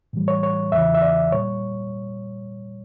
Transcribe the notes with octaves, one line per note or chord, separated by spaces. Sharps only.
A2 E3 G3
C#5
C#5
E2 C#3 E3 E5
E5
D5
A#2 G3 C#5